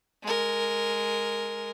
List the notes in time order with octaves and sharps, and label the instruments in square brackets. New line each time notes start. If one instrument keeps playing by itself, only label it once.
[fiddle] G#3 A#4